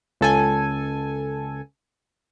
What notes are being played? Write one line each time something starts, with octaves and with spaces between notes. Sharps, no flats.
C#2 A4 G#5